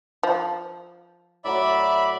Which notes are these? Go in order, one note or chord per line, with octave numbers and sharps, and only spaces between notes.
F3
A2 F#3 D5 E5 B5